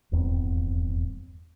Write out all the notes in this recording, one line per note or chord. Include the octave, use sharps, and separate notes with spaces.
D#1 E2 G2 C4